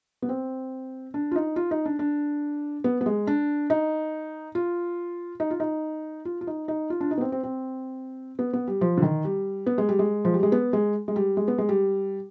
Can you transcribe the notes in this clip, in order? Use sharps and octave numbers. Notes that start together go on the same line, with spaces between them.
B3
C4
D4
F4
D#4
F4
D#4
D4
D4
B3
B3
G#3
D4
D#4
F4
D#4
F4
D#4
F4
F4
D#4
D#4
F4
D4
D#4
B3
C4
C4
C4
B3
B3
G3
F3
D3
D#3
G3
B3
G#3
G3
G#3
F3
G3
G#3
B3
G#3
G#3
G3
G#3
B3
G#3
G3